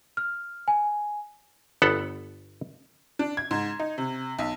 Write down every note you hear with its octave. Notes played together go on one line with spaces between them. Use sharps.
F6
G#5
G1 B3 A4 F#5
D4
G#6
G#2
D#4
C3
B1